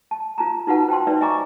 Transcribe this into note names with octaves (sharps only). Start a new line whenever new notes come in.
A5
F4 A5 A#5
D#4 F4 F#4 B4 F#5 A5
C5 G5 A5 C6
D#4 B4 C5 D5 E5
D#5 E5 G#5 A#5 C#6 D6